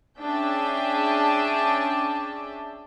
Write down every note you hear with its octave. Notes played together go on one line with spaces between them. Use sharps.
C#4 D4 G#4 E5 G5 A5